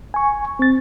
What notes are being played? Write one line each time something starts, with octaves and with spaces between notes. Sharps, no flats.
G#5 C#6
C4 A6